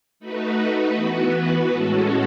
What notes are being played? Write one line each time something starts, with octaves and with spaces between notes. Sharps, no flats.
A3 D#4 F#4 B4
E3 B3 F#4 B4
A2 G#3 C#4 F#4 A4